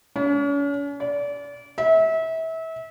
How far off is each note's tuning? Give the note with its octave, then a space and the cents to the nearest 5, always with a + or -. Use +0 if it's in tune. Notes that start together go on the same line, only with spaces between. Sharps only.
C#4 +40
D5 -30
E5 -30